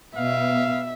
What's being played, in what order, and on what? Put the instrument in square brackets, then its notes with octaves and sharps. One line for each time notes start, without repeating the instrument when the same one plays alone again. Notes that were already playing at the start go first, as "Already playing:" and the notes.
[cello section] B2 [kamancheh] E5 [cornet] F5